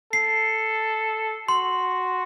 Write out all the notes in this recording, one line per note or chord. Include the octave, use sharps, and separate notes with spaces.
A4 C7
F#4 C6